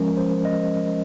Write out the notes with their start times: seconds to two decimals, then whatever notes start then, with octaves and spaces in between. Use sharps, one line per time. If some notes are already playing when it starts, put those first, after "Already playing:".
Already playing: F3 G#3 C#4 A#4
0.17 C5
0.45 D#5